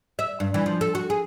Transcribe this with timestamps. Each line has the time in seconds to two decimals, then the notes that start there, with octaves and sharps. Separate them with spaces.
0.19 E5
0.40 G2
0.54 E3
0.66 F3
0.81 A4
0.95 F#4
1.10 G#4